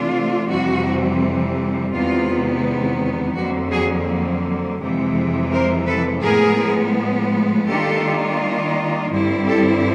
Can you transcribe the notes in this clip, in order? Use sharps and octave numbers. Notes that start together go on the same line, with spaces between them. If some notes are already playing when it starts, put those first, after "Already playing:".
Already playing: C3 E3 A3 D4 F4
F2 C3 E3 G3 C4 F#4
E2 C3 D#3 G#3 B3 F4
F2 D3 F#3 A#3 F#4
F#4 G#4
F2 C3 E3 G#3
A#4 C5
A4 B4
A2 F3 G#3 B3 G#4 A#4
D#3 G3 A#3 D4 F4 G4 A4
G2 D3 G3 C4 E4
G4 A4